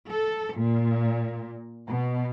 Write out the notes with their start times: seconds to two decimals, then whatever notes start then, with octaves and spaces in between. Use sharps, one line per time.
0.10 A4
0.57 A#2
1.88 B2